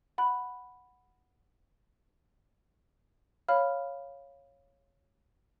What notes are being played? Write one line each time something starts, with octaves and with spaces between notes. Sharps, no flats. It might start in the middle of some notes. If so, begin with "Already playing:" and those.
F#5 B5 F#6
C#5 F5 B5 F6